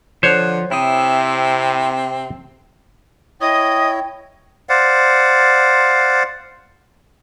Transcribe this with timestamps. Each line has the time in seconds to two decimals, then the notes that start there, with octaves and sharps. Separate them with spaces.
0.23 D3 F3 C5 C#5 F#5
0.71 C3 C4 E4 D#6
3.41 E4 C#5 D#5 G5 D#6
4.69 C5 D5 F5 F#5